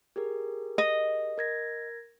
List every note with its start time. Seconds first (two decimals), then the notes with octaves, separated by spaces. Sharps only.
0.16 G4 G#4 A#4
0.78 D#5
1.38 A#4 G#6 A#6